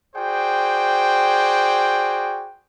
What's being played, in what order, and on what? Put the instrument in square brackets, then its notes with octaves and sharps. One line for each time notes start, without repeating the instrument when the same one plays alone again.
[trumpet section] F#4 G#4 C5 D5 G5